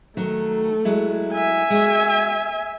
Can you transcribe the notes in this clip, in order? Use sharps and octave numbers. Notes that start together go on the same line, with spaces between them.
D#3 F#3 A3
F#3 G#3 E4
E5 G#5
G#3 F#4